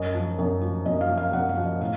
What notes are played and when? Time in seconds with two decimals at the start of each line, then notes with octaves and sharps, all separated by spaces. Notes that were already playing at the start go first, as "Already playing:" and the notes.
Already playing: F#2 D#5
0.14 F3
0.39 F#2
0.61 F3
0.86 F#2 D#5
1.01 F5
1.09 F3
1.18 F5
1.33 F#2 F#5
1.49 F5
1.57 F3
1.65 D#5
1.80 A2 F5